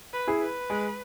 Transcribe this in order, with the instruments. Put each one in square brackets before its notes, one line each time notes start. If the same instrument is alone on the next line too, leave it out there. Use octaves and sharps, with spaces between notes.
[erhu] B4
[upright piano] E4 G#4
[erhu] B4
[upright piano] G#3